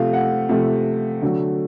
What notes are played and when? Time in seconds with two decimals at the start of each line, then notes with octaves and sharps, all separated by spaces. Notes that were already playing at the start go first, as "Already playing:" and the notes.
Already playing: C3 F3 A3 F5
0.13 F#5
0.49 C3 F3 A3
1.22 D3 F#3 A3